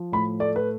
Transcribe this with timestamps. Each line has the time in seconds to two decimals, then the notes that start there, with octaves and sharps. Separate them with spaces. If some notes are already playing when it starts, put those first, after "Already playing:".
Already playing: F3
0.12 A2 B5
0.40 A3 D5
0.56 B4